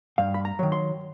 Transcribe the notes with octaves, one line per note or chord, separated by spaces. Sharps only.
G2 F5
B5
A#5
D#3 F#3
C6